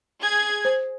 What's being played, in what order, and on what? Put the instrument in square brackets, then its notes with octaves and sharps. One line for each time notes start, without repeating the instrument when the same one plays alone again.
[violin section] G#4 G#6
[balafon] C5